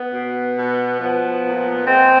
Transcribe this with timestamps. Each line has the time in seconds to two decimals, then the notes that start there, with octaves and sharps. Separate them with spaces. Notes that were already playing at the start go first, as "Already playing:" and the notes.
Already playing: B3
0.13 B2
0.56 B2
1.00 F3 B3
1.44 A#2
1.87 G#3 C4